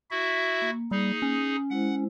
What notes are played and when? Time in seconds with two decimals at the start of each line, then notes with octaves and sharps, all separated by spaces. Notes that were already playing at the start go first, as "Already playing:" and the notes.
0.11 E4 F#4 E5
0.62 A#3
0.91 G3 D#4 G#4
1.22 C#4
1.70 G#3 E4 C5 F#5